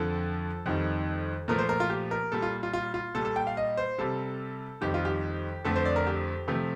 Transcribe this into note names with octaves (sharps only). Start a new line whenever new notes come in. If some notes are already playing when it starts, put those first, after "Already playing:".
Already playing: F2 D3 F3 A4
F2 D#3 G3
A#2 F3 A3 A#4
C5
A#4
F4
G4
A#4
A#2 G3 A4
F4
F4
F4
F4
A#2 G3 A4
A4
G5
F5
D#5
C5
C3 G3 A4
F2 D#3 G3 G4
F4
G4
F2 D3 A3 A4
C5
D5
A#4
G4
C3 F3 A3